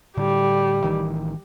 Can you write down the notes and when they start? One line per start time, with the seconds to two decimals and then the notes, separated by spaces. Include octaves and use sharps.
0.17 A2 D3 G3
0.83 A1 D#3 E3